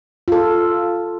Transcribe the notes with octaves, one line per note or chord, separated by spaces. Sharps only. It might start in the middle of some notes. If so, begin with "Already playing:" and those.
F4 A4